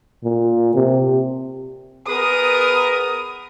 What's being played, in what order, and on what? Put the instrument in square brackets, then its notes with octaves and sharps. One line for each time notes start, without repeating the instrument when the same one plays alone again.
[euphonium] A#2
C3
[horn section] B3 G#4 A#4 [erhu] D#6